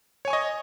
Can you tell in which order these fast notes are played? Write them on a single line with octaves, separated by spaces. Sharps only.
C#5 G#5 C#6 D#5